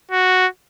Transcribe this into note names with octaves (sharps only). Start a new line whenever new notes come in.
F#4